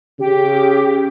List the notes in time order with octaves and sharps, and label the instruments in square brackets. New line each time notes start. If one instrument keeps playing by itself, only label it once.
[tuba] C#3 [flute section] G4